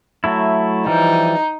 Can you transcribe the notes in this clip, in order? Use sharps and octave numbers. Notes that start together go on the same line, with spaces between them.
F#3 A3 E4
E3 F3 G3 D#4